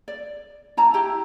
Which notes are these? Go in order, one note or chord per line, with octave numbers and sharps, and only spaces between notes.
D5
E4 A5 A#5
E4 G4 A#5